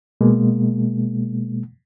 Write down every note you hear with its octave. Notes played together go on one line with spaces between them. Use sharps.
B2 G#3 A#3